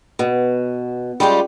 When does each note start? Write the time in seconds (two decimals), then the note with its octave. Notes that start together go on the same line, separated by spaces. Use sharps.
0.19 B2
1.20 G3 G#3 C#4 F4 G4